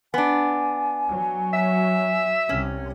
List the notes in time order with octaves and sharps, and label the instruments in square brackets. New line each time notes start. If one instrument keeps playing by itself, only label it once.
[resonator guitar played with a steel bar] B3 D4 [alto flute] G#5
[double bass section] F#3
[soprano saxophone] E5
[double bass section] C2 C3 [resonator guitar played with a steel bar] C#4